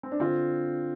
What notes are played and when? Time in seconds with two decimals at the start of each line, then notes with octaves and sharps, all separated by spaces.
0.03 C4
0.12 D4
0.20 D3 C4 F4